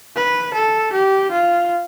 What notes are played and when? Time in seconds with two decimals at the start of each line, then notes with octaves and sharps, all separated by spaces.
0.16 B4
0.54 A4
0.93 G4
1.31 F4